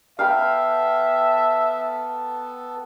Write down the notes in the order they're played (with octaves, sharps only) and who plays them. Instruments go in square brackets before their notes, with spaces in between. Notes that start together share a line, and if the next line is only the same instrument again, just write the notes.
[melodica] B3 A4 [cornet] E5 [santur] F5 G5 B5